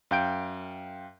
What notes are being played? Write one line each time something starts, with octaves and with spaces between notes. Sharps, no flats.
F#2 F5 G5 G6 D7